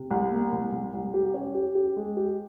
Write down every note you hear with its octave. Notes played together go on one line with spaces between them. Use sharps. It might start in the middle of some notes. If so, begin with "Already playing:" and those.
Already playing: C3
C2
A#3
C2
C2
C2
G4
C#4
G4
G4
G#3
G4